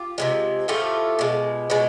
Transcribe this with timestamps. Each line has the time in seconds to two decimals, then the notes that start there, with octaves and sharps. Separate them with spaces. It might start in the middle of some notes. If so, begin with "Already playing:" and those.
Already playing: F4 G4
0.18 C3 E3 G#3
0.68 A2 F3 A3 F4 G4
1.19 B2 G#3
1.70 B2 G#3